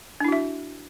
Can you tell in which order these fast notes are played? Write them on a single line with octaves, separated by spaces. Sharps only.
D4 E4 F#4 E5